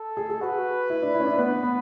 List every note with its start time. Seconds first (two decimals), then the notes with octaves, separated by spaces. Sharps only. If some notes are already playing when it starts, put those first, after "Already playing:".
Already playing: A4
0.17 G#4
0.30 G#4
0.41 F#4 B4
0.90 E4
1.02 D4
1.15 E4
1.20 C#4
1.26 D4
1.38 B3 B4
1.63 B3